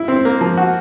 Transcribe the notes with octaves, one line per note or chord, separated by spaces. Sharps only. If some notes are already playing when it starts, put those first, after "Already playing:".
Already playing: E4
C4
A#3
F3
F#4